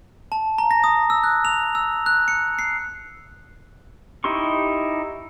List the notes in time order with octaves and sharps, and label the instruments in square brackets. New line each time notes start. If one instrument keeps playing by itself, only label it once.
[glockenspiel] A5
A#5
A#6
D#6
E6
F#6
F7
E6
F#6
C#7
C7
[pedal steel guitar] D#4 E4 G4 C6 C#6